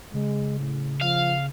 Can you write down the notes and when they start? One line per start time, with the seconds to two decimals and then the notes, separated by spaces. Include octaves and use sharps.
0.14 C#3 G#3
0.59 A2
1.01 F3 F5